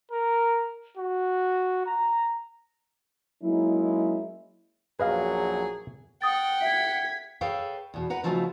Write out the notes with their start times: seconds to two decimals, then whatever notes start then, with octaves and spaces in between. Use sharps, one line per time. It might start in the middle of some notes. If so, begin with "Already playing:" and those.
0.12 A#4
0.98 F#4
1.87 A#5
3.43 F#3 G#3 A#3 C#4 D#4 E4
5.00 A#1 F#2 F#3 G#4 B4 D#5 F5
6.22 F#5 G5 D#6 A6
6.62 E5 G#6 B6
7.41 G#4 A4 B4 C#5 F5 G5
7.94 E2 B2
8.10 B4 F#5 A#5
8.23 C#3 F3 F#3 A3 B3 D#4